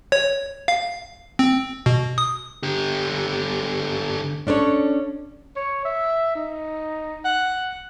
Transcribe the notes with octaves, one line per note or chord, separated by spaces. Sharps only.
C#5
F5
C4
B2
D#6
D3 G4
C#4 D4 A4 B4 C#5
C#5
E5
D#4
F#5